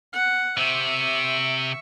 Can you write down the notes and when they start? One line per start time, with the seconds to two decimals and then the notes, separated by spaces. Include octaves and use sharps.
0.13 F#5
0.57 C3 E5 C#6